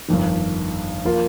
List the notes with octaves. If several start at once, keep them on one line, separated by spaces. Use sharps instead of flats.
G1 F2 D#3
F3 A#3 F4 A#4